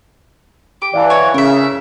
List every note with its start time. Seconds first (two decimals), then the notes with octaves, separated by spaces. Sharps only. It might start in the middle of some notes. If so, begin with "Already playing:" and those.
0.82 G4 D6
0.94 E3 D5 F5 A5
1.10 F#4 C#5
1.34 C#3 C#4 A#4 E5